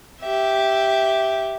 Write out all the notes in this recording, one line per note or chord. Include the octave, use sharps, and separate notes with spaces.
G4 E5